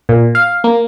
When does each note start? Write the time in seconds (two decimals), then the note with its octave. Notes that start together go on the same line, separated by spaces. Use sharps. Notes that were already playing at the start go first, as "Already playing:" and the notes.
0.09 A#2
0.35 F5
0.64 A#3